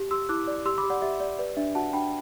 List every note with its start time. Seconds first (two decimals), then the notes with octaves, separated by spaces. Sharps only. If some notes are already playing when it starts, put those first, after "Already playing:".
Already playing: G4
0.11 G4 C6 E6
0.29 E4 D6 F#6
0.47 D5
0.66 G4 C6 E6
0.78 B5 D6
0.84 G4
0.90 D5 F#5
1.02 G4 E5
1.20 D5
1.39 B4 D5
1.57 D4 E5
1.75 F#4 F#5 A5
1.93 D4 G5 B5